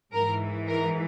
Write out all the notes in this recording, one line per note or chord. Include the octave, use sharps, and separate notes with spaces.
G#2 E3 A#4
A#4